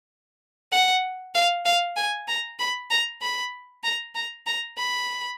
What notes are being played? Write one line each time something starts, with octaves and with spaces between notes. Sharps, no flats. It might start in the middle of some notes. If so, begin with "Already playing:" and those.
F#5
F5
F5
G#5
A#5
B5
A#5
B5
A#5
A#5
A#5
B5